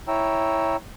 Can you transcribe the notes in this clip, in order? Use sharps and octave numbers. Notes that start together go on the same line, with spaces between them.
E4 C#5 G5 A#5 E6